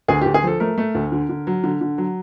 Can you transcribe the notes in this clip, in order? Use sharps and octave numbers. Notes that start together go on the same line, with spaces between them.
D2 G#4
G4
D2
G#4
F3 A4
A3 A#4
A3
D2
D3
D3
F#3
D3
D3
F#3